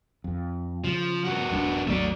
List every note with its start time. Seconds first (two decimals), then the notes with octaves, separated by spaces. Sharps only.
0.24 F2
0.84 C#3 F3
1.25 G2 F#4
1.50 D#1 G3 D4
1.88 G#1 D#2 F#3 A3 D5